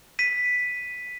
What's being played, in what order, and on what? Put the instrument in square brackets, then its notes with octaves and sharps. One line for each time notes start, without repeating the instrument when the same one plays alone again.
[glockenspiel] B6 D#7